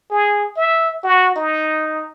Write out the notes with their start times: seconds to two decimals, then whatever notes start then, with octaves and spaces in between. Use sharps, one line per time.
0.11 G#4
0.57 E5
1.04 F#4
1.36 D#4